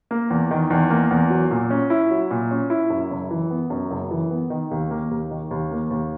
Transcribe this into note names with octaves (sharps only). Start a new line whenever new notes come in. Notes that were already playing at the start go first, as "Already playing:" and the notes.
A#3
E2
D#3
E2
A#3
E2
F#3
A#2
C#4
E4
F#3
A#2
C#4
E4
F#2
F#1
E3
B3
F#2
F#1
E3
B3
D#3
D#2
A#3
D#2
D#3
D#2
A#3
D#2